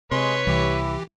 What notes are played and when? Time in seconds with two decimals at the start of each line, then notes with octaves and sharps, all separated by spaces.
0.12 C3 G#3 B4 C#5 C6
0.47 C2 E3 E4 G4